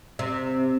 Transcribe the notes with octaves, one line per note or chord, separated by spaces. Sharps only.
C3